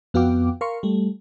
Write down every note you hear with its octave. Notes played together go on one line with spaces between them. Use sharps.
F2 B3 F#4 F5 G5 D6
A#4 F5 C6 C#6
G3 A3